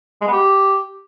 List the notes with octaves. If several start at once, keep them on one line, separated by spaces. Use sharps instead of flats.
G#3
B3
G4